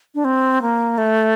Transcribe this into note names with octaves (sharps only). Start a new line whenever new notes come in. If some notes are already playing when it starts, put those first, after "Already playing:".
D4
C4
A#3
A3